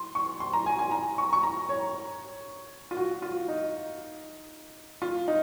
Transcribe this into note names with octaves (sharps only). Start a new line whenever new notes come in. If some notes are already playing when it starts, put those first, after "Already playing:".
Already playing: C6
C#6
C6
A#5
G#5
G#5
A#5
C#6
C#6
A#5
C#5
F4
F#4
F4
D#4
F4
D#4